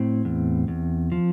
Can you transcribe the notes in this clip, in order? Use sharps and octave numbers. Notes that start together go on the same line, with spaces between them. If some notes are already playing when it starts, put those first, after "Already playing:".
Already playing: A2 C4
E2
E2
F3